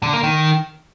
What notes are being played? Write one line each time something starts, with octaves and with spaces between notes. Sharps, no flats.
D3
A#3
D#3